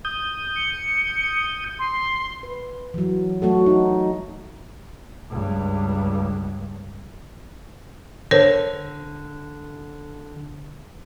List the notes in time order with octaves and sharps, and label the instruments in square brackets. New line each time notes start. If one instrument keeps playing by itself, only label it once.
[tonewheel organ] D#6 G6
[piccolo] C#7
C6
[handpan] B4
E3 F#3
F#3 A3 F#4 A4
D#4
[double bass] C#2 G2
[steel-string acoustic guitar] D3 [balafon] A#4 C5 C#5